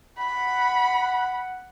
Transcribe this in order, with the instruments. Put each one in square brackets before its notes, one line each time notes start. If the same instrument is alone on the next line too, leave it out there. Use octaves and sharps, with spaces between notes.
[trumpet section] F#5 [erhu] B5